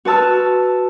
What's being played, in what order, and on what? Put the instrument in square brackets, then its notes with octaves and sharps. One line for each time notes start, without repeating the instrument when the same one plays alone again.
[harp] F#4 B4 A5 E6 F6